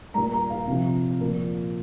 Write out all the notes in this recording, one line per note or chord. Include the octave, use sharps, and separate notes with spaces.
A#2 G3 A#5
A#5
F5
C3 F3
A#2 F3